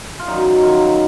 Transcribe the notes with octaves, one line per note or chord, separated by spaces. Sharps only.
F4
F#2 D#3 F#3 D#4
F#2 D#3 F#3 F4